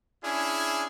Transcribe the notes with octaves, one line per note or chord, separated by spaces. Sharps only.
C#4 D4 E4 G#4